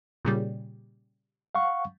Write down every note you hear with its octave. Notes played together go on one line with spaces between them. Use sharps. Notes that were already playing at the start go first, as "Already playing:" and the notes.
A#2 C#3 G3
F5 F#5 C#6